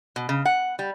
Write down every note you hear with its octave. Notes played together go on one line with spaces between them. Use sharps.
B2
C#3
F#5
G3